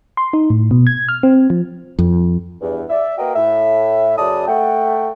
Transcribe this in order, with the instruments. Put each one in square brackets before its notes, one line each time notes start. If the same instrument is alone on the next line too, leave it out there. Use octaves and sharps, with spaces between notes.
[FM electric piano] C6
D#4
A2
B2
G#6
F6
C4
F3
[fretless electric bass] F2
[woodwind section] E2 G2
D5 E5
A#3 F#4 A#4 B4 D#5 G5
A2 E5
F#2 C#3 D5 A5 D#6
A3 F#5 G5